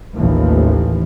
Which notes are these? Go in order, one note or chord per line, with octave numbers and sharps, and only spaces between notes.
A1 D#2 A2 E3 F3